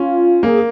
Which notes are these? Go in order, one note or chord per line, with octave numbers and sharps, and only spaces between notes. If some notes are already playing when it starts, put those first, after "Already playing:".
Already playing: C#4 F4
A#3 G#4